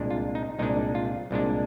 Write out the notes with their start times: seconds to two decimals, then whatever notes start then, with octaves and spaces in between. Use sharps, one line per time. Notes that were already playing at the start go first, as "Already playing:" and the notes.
Already playing: C2 A#2 G#3 D4
0.10 F4
0.35 D#4
0.59 C2 A#2 G#3 D4 D#4
0.95 F4
1.31 C2 A#2 G#3 D4